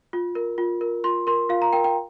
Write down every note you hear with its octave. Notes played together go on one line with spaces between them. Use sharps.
F4
A#4
F4
A#4
F4 C6
A#4 C6
F4 F5
A#5
A#4 G5
G5